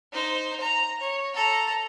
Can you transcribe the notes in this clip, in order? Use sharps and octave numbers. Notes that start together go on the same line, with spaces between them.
D#4 C5
A#5
C#5
A4 A#5